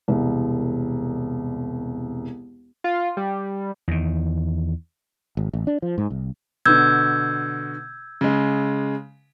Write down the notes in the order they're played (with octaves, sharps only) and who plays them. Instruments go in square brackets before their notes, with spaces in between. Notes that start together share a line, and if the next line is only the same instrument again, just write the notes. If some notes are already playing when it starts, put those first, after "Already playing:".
[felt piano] E1 C2
[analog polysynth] F4
G3
[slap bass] E2 D#3
[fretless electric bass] G#1
A1
D4
F3
G#2
C2
[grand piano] B2 D3 [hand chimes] E6 G6 G#6
[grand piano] C#3 G#3